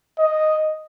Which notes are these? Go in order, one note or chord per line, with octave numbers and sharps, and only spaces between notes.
D#5